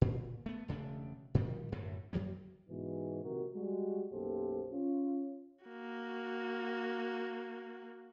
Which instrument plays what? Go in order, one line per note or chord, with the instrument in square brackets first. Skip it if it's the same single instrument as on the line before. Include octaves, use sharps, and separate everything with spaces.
[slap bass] A#2
A3 B3
E1 C#3 A3 D4
A#2 D#3 F3 G3
F#2 A2 D3
F#2 F#3 G3 A#3
[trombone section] G#2 B2 E3
A#1 C3 D#3 F#4 A#4
G3 G#3 F#4
B1 F#2 A#3 G4 A4 C5
C#4 F4
[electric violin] A#3 F#4